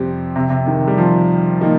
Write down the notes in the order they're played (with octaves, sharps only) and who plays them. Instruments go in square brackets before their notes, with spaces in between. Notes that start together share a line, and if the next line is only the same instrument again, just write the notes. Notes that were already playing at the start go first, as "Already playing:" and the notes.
Already playing: [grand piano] F2 C3 G3 C4
[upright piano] C3
C3
D#3
G3
F3
[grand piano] D#3 A#3 D#4